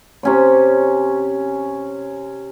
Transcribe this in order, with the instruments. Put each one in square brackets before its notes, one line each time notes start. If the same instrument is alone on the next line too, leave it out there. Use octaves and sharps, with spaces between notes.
[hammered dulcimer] C3 C#4 C#5